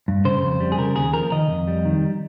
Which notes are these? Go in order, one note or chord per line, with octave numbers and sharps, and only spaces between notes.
G2
C#3 C5
F2
G3
G#4
C#3 A#4
D#2 G#4
F3 A#4
D#3 D#5
F2
G3
D#3